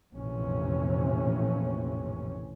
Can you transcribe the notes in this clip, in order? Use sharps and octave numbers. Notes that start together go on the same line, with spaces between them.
A#1 F2 A2 C3 E3 C#4